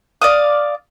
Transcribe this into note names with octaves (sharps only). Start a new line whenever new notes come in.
D5 F5 D#6